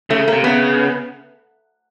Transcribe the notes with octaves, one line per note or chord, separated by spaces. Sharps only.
C#3 A3
C3 A#3
C#3 B3